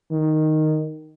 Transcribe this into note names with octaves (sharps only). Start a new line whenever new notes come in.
D#3